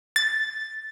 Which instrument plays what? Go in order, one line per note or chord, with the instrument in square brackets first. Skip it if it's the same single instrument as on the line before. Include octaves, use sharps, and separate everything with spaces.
[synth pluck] A6